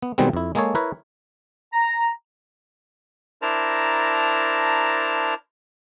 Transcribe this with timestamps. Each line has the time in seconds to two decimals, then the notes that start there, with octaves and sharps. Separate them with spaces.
0.02 B3
0.18 B2 D#3 G3 G#3 B3 C4
0.33 F2 E4
0.55 G#3 A#3 G#4 A4 C#5
0.75 E4 A#4 B4 C#5
1.73 A#5
3.42 D4 E4 A#4 C5 A5 A#5